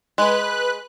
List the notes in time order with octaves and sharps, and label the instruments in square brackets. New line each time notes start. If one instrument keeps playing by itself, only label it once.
[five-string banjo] G#3 [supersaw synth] B4 F#6